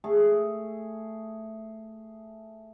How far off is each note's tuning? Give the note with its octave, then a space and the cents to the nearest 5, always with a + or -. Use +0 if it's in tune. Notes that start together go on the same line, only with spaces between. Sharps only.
A3 +0 G#4 +0